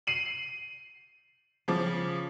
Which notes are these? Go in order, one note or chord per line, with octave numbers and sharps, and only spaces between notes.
C7 D#7 F#7
C#3 F3 D6